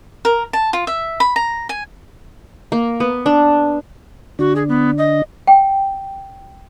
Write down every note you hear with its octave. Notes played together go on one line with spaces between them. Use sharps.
A#4
A5
F4
E5
B5
A#5
G#5
A#3
B3
D4
D3 D4 F#4
G#4
B3
D#5
G5